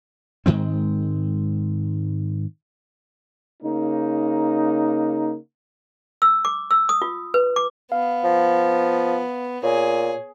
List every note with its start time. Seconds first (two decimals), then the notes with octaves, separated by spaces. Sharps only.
0.46 G#2 D#3 G#3 C4
3.63 C#3 A#3 D#4
6.22 E6
6.45 D6
6.71 E6
6.89 D#6
7.02 F4
7.34 B4
7.56 D6
7.92 B3 F5
8.24 F3
9.64 A#2 G#4 C#5